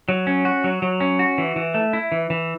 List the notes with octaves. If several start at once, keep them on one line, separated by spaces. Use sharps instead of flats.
F#3
C#4
F#4
F#3
F#3
C#4
F#4
E3
E3
A3
E4
E3
E3